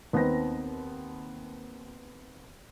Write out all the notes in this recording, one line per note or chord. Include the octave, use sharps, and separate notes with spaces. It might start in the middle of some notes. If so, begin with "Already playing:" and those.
D#2 B3 C4 D#4 B4 A#6